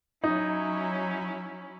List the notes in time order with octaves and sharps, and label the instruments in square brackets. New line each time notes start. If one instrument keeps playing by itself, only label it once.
[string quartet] F#3 C#4 E4 [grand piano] D#4